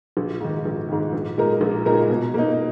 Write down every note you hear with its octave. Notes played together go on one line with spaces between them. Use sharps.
A#1
G#2 D#3
A#1
G#2 D#3
A#1
A#2 G#3 D#4 A#4
A#1
A#2 G#3 D#4 A#4
B2
A#3 D#4